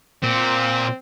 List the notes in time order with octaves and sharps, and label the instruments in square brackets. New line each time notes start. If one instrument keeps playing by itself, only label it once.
[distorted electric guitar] A#2 [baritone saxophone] C4